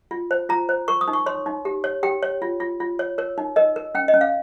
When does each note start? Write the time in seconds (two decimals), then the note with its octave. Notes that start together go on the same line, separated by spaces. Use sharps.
0.11 F4
0.31 C5
0.49 F4 A#5
0.69 C5
0.88 A#4 C#6
1.01 D#6
1.08 D#4
1.13 C#6
1.26 C#5 C6
1.46 D#4
1.65 G4
1.84 C#5
2.03 G4 G5
2.23 C#5
2.42 F4
2.60 F4
2.80 F4
2.99 C#5
3.18 A#4 C#5
3.38 D#4
3.56 A#4 D#5
3.76 A#4
3.95 C#4 G5
4.08 D#5
4.14 C#4
4.21 F5